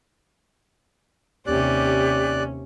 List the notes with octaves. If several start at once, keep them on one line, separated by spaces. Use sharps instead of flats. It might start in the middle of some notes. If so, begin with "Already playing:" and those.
D#2 C3 C#4 G4 D5 F#6